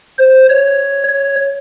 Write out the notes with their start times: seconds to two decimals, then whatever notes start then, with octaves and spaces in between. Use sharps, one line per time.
0.18 C5
0.50 C#5
1.09 C#5